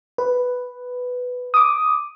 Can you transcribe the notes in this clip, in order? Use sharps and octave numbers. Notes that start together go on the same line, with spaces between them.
B4
D6 D#6